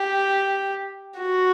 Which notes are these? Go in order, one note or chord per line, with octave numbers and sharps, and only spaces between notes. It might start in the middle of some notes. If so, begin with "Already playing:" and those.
Already playing: G4
F#4